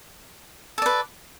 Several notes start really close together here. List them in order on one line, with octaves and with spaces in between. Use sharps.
A4 D5 B4